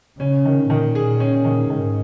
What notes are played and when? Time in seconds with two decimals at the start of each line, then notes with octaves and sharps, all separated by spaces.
0.20 C#3 C#4
0.45 D#3
0.70 A#2 D#3
0.95 G#4
1.20 C#4
1.45 D#3
1.70 G#2 D#3